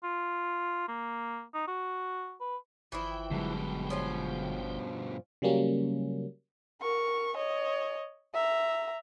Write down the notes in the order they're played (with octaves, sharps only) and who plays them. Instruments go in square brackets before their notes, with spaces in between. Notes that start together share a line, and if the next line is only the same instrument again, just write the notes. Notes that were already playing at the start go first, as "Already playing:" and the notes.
[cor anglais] F4
A#3
D#4
F#4
B4
[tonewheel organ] G1 G5 [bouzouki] E3 F3 E4
[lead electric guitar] G2 B2 [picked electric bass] D3 F#3 G#3
[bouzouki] F3 C#4 F4
[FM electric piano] C#3 F#3 G3 A#3 C#4
[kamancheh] A#4 C#6
C#5 D#5
E5 A#5